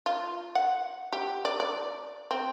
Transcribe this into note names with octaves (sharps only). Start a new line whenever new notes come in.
F4
F#5
G4
D5
D5
C4